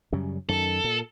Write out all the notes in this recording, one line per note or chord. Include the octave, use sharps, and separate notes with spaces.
F#2 C#3 G3
F#2 D#3 A4
A#2